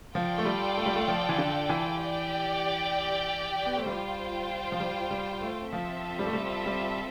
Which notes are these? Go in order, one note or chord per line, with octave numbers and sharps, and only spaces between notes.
F3 F4 A4 D5 G5
A3
G3
A3
G3
A3
F3
E3
D3
E3
G4 D5 G5
B3
A3
G3 F4 C5 G5
F3
G3
G3
A3
F3 C4 F4 A4 E5
G3
A3
G3
G3